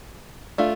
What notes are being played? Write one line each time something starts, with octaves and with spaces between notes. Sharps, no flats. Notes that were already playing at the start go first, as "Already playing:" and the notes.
A3 D4 F4